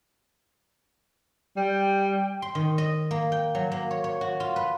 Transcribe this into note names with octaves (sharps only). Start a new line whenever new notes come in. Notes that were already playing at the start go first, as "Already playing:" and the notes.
G3 G5
C6
D#3
D#5
A#3
G5
F#3
A#3
C#5
C#5
F#4
F4
B4